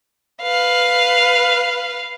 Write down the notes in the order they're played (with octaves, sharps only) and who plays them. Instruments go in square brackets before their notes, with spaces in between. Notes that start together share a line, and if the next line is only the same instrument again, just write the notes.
[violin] B4 F5